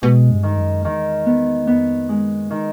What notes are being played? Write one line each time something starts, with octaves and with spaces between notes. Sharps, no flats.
B2 G#3
G2
D#3
F#2
E2 D#3
B3
F2 B3
F#2 G#3
D#3